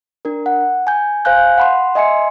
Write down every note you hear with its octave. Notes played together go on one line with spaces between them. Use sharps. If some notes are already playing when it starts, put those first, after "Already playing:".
D4 A#4
F#5
G#5 G6
C5 F5 G#5 F#6 G6
F#5 B5 C6
D#5 E5 G#5 C6 C#7